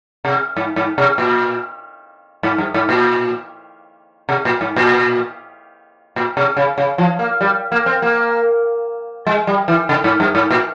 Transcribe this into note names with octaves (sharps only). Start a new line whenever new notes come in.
C3
G#2
G#2
C3
A#2
G#2
G2
G#2
A#2
C3
A#2
G#2
A#2
A#2
C3
C#3
C#3
F3
A#3
G3
A#3
C4
A#3
G#3
G3
E3
C#3
G#2
G2
G#2
A#2